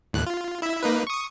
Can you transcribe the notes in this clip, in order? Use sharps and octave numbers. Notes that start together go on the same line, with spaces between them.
D#2 A2 F#6
F4
E4 E5
A#3 D#4 B4
C#6 D#6